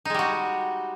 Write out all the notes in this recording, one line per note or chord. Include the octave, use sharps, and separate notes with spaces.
G3 G#3 D#4 F#4